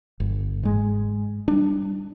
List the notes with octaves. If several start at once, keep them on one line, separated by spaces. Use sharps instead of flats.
G1
G#2 G#3
G3 D4